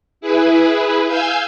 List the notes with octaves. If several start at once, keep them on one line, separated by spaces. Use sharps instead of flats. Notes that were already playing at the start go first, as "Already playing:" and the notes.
E4 G#4 B4
F5 G#5 E6 G6